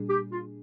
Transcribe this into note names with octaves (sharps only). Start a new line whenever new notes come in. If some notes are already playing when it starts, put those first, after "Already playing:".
Already playing: A#2 G3 D4 G#4
G4
F4